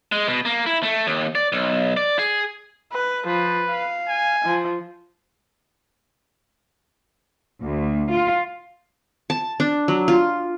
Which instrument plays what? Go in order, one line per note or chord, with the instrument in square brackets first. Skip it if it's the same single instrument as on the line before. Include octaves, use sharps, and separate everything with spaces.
[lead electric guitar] G#3
B2
A#3
E4
A3
D#2
D5
B1
D5
G#4
[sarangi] B4
[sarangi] F3 [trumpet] B4
[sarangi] F5
[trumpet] G#5
[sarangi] F3
[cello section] D2
F4
[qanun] A5
D4
F#3
F4